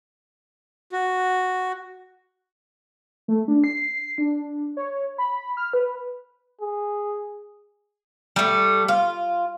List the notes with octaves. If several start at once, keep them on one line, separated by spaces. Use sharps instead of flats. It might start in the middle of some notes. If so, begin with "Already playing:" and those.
F#4
A3
D4
C7
D4
C#5
B5
F6
B4
G#4
G3 A3
F4